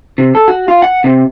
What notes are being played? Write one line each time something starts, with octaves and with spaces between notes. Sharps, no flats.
C3
A4
F#4
F4
F#5
C3